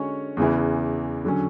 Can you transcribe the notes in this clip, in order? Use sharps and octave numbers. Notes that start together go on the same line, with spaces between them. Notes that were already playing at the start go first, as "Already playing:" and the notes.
Already playing: D3 G#3 C#4 F#4 C#5
E2 C#3 E3
D3 F#3 C#4